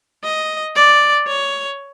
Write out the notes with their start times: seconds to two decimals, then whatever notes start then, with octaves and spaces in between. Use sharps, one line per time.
0.23 D#5
0.76 D5
1.27 C#5